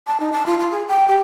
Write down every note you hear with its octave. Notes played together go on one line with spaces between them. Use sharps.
A5
D#4
A5
F4
F4
G#4
G5
G4